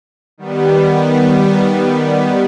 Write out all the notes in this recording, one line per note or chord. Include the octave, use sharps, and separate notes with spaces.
D#3 G3 B3